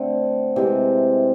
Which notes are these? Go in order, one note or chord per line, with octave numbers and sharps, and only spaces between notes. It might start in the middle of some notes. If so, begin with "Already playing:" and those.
Already playing: D3 A3 C4
C3 E3 G#3